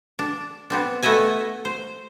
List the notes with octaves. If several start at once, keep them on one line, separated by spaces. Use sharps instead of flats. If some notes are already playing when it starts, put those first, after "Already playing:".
D4
B3 C4 D4
A3 B3 D#5 E5 G#5
C5